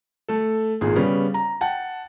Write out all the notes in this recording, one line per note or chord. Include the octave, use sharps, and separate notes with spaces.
A3 A4
G#1 A#2 G#4
C#3 G3 B3 C#4
A#5
F#5 G5 A5